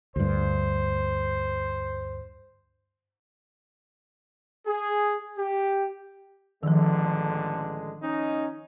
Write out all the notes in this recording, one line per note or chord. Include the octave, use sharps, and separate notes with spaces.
D2 G2 C5
G#4
G4
A1 D3 D#3 F3 G#3
C#4 D#4